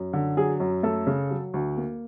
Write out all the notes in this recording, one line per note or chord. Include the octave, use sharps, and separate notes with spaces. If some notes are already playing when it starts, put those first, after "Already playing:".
Already playing: F#2
D3
F#3 G#4
F#2
A3 A4
C#3
F#3
D2
A#3